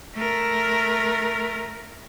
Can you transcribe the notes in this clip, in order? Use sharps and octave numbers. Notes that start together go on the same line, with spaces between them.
A3 A#4